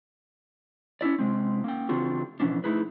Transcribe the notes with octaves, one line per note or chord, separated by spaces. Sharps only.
C#4 D4 E4 D5
C3 G#3 C4
A#3 C#4 G5
C#3 E3 C4 D4 F4 F#4
B2 E3 F3 C#4 D4
A3 D#4 E4 G#4 B4